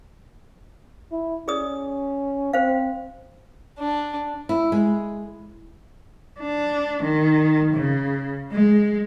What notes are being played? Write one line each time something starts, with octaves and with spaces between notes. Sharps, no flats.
E4
C#4 G#4 D5 D#6
C4 C5 F5
D4
E4
G#3
D4
D#3
C#3
G#3